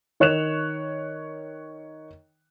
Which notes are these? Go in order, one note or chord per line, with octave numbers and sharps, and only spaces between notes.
D#3 C#5 F#6 E7 F7